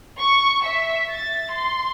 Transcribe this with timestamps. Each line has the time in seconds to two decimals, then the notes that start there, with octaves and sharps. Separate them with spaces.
0.18 C#6
0.64 E5
1.11 A6
1.51 C6